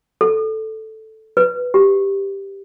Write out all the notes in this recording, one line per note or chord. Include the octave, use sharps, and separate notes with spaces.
A4
B4
G4